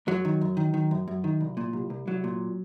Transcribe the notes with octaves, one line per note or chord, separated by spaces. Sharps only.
F#2 F#3
D#3
F#2
D#3
D#3
F#2
F#2
D#3
C2
A#2
C2
C2
C2 F#3
A#2